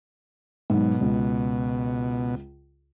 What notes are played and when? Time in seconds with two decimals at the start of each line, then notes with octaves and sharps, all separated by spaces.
0.70 G#2 B2 F#3
1.01 C#2